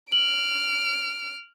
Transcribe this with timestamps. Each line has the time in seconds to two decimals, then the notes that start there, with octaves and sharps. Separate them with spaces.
0.12 F6 D7 F#7